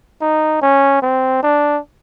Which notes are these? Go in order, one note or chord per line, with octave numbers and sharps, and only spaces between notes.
D#4
C#4
C4
D4